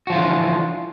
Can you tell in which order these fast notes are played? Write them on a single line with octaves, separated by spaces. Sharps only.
F#4 F3 F4 E3 D3